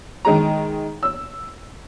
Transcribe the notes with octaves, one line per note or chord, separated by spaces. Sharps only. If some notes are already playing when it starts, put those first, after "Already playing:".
D#3 G#3 G#4 A#5
E6